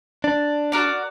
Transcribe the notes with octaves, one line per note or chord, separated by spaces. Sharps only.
D4
F#4 A#4 D5